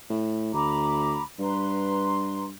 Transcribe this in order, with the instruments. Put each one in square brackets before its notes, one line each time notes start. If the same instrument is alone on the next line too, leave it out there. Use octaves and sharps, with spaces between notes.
[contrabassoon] A2
[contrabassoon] D2 [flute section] A#5 B5 D6
[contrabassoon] G2 [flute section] B4 A#5 C6